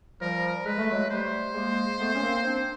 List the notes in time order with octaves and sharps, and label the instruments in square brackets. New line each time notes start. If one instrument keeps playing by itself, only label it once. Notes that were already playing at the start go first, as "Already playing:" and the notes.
[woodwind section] F3 G3 [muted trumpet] A#4
[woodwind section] G#3 [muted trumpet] B4
[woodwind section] A3
F#3 G#3
[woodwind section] G3 A3 [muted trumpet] C5
[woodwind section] G#3 A#3
A3 B3
C#4
A#3 C4
C4 D4